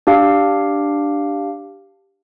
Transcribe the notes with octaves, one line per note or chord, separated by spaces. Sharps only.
D4 G4 F5